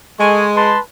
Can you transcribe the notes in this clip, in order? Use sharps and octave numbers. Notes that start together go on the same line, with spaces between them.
G#3 A4 G#5 C#6
B4 A5 C6